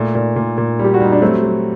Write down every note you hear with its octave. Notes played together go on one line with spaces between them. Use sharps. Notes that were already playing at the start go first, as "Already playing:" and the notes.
Already playing: A#2 A3
A#2
A#2
A#2
G3
G4
F#4
G3 D#4
D4
F#3 A3 C4
F#3